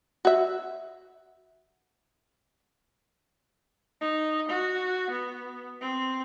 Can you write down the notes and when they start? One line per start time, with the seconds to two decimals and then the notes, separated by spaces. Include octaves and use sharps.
0.25 F#4 E5
4.01 D#4
4.49 F#4
5.11 B3
5.81 C4